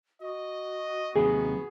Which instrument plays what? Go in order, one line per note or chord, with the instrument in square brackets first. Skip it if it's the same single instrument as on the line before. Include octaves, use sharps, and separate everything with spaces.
[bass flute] F#4 [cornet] D#5
[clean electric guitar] D#2 C3 F#3 [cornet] B3 [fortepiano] G#4